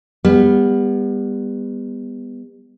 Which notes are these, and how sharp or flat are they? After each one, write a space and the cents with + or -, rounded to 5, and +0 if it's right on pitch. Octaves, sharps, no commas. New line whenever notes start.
G3 +35 B3 +0